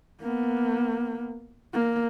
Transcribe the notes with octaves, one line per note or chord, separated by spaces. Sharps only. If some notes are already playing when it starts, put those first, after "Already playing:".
A#3 B3
A#3